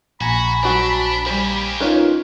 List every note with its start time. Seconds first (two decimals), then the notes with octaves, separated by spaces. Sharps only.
0.21 A#1 F#4 G#5 A#5 B5
0.63 F#3 D4 F#4 C5
1.26 G3 A#3 G4 C5
1.80 C#4 D#4 F4 A#4 B4 C#5